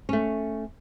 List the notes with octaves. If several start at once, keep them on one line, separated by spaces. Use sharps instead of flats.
A3 C#4